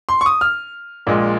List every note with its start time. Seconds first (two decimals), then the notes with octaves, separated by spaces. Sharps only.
0.09 C6
0.21 C#6
0.26 D#6
0.41 F6
1.07 A#1 A#2 G#3